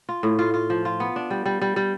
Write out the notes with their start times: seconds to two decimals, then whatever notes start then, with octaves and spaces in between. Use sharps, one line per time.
0.09 F4
0.23 A2
0.39 F4
0.54 F4
0.70 F3
0.85 F4
1.00 B3
1.16 D4
1.31 G3
1.46 G3
1.62 G3
1.76 G3